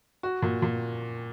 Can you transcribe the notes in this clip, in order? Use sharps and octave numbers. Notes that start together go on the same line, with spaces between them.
F#4
A#2
A#2